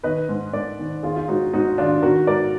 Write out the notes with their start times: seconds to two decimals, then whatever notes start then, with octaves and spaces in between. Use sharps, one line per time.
0.03 D#3 B4 D#5
0.29 G#2
0.53 G#2 A#4 D5
0.79 D#3
1.03 D#3 F4 G#4
1.16 F4
1.28 G#2 D#4 F#4
1.53 G#2 D#4 F#4
1.78 D#3 D4 F4
2.03 D#3 F#4 A#4
2.27 G#2 A#4 D5